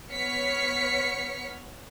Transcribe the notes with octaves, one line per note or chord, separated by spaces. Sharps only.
B3 C#5 F6 B6 C#7